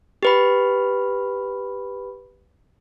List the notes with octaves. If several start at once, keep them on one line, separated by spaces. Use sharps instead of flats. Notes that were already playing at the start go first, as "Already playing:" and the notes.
G4 B4 B5